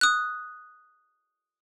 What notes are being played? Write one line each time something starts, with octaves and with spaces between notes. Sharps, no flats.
D#6 F#6